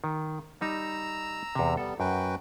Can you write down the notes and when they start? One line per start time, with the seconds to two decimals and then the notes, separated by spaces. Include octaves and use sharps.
0.04 D#3
0.61 G3 D#4 A#5 E6
1.55 E2 C3
1.77 G3 B3 A4
2.00 F#2 F#4 B4 G5